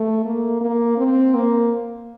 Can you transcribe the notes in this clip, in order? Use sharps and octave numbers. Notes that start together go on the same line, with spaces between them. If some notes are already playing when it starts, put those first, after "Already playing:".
Already playing: A3
A#3
A#3
C4
A#3